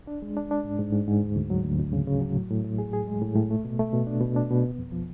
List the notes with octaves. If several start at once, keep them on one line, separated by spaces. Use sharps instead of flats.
D4
G#3
D4
D4
G#2
G#2
G#2
G#2
D2
D2
F#3
D2
D2
C#3
C#3
F#3
A2
A2
A2
G#4
G#4
G#3
A2
A2
A3
B2
A3
B2
D4
B2
D4
B2
B3
F2
F3